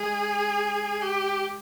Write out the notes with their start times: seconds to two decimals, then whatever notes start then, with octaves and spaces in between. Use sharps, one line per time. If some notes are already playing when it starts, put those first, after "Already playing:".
Already playing: G#3 G#4
1.02 G4